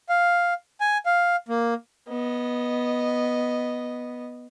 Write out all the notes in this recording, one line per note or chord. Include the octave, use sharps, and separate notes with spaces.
F5
G#5
F5
A#3
B3 D#5